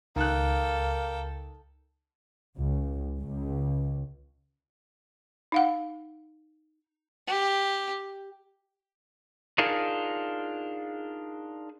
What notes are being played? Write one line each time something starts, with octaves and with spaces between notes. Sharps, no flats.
C#2 D#3 A#3 A4 G5 F#6
C#2
C#2
D#4 F5 F#5
G4
D4 D#4 F4 G#4 A#4